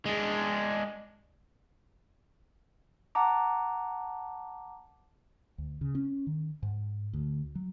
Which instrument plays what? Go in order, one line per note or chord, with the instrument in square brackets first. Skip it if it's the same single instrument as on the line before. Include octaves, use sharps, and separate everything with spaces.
[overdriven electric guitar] G#3 D4
[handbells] F#5 A5 A#5 D6
[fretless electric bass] D2
C#3
C#4
D#3
G#2
D2
F#3